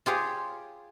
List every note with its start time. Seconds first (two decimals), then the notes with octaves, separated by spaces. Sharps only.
0.06 F4 G4 G#4 C#5